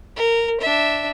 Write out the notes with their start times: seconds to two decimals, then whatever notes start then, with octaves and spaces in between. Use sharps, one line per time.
0.16 A#4
0.60 D4 E5